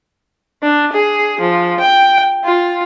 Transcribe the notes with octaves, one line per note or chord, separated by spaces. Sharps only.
D4
G#4
F3
G5
F4